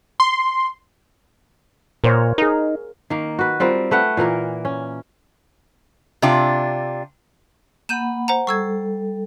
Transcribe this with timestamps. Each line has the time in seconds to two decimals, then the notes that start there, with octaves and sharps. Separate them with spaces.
0.20 C6
2.04 A#2 A#4 C5 C#5
2.38 D#4 G#4 A#4
3.10 D#3 A#3
3.39 F#4 B4
3.60 G3 C4 F4 A#4
3.91 A3 B4 F#5 G5
4.17 A#2 E3 A#3 A#4
4.65 C#4
6.22 C3 D4 F4
7.89 A#3 F#5 B5 G6 D#7 E7
8.28 C5 F#5 A#5
8.47 G3 A4 C#6 E6 G#6